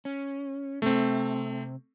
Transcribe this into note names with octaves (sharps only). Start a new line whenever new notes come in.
C#4
C3 A3 C4